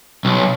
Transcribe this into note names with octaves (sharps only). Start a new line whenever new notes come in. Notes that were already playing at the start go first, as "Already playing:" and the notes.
B1